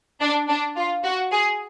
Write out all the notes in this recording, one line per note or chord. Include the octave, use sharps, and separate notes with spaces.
D4
D4
F4
F#4
G#4